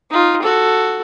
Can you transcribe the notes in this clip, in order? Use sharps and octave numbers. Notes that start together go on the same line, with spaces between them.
D#4 F4
F#4 A4